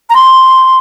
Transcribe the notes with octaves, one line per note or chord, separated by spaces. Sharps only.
A#5
C6